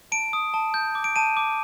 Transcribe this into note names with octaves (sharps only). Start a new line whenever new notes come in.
A5 D7
D#6
A5
G6
D6
D7
A5 D#7
D6